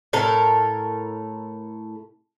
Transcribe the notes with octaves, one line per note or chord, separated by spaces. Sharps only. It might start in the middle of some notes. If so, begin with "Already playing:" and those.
A2 A4 A#4